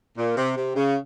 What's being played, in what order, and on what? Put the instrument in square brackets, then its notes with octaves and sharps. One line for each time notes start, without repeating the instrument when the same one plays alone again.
[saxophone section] A#2
C3
C3
C#3